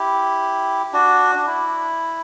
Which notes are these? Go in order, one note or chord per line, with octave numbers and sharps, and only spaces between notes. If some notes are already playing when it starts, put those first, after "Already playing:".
Already playing: E4 G4
D4 F#4
D4
E4